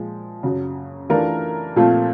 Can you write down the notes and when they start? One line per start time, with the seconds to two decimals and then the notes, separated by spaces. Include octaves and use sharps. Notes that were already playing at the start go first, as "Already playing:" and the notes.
Already playing: A#2 F3 G#3
0.43 F#2 C#3 F#3
1.10 E3 A3 D4 F4 A#4
1.76 A#2 F3 A3 C4 F4